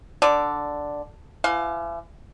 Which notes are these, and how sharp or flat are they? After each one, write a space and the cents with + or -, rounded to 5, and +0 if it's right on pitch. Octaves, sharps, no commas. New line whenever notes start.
D3 +0 D5 +0
E3 +40 F5 +25